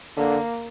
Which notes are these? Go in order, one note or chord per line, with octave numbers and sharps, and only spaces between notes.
D3 A#3